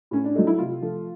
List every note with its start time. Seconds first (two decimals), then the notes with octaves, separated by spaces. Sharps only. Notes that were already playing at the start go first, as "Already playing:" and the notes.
0.11 A2 C#4
0.24 D4
0.35 F#3 A3 D#4
0.47 E4
0.58 C3 F4
0.82 F3 A3